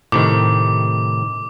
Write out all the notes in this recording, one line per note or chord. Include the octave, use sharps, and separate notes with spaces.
A2 C3 D#3 D6